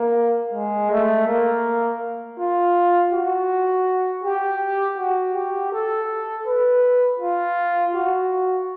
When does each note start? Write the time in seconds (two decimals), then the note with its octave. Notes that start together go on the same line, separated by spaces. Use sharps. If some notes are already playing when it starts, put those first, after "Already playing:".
Already playing: A#3
0.54 G#3
0.91 A3
1.27 A#3
2.38 F4
3.13 F#4
4.24 G4
4.98 F#4
5.35 G4
5.72 A4
6.46 B4
7.20 F4
7.95 F#4